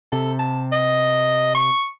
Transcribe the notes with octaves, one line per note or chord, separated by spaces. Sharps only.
C3 A4
A5
D#5
C#6